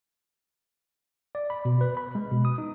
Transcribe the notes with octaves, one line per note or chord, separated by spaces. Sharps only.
D5
B5
B2
B4
B5
G#3
B2
D#6
D#4